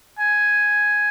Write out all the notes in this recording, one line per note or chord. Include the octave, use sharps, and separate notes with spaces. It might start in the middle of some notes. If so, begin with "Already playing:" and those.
G#5